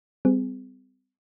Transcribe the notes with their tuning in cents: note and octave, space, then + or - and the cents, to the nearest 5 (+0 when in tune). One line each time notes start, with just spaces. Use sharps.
G3 +0 C4 -40 G#4 +0